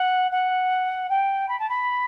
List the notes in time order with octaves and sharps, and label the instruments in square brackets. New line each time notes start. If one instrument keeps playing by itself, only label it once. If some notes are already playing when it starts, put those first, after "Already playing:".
Already playing: [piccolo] F#5
F#5
G5
B5
A5
B5